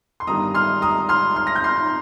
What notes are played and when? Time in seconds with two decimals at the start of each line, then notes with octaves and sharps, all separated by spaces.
0.20 C6
0.27 G1 G2 D#3 G3 A#5 D#6
0.55 C6 F6
0.82 A#5 D#6
1.09 C6 F6
1.36 C6 F6
1.47 A#6
1.55 G6
1.64 C6 F6